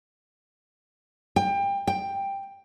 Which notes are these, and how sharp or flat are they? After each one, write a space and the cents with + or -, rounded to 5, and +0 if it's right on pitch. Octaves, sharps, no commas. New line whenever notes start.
G5 +25
G5 +10